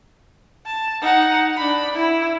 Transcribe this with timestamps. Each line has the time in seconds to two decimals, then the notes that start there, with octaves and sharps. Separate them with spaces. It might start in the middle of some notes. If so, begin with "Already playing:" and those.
0.66 A5
1.01 D#4 F#5
1.56 D4 B5
1.93 E4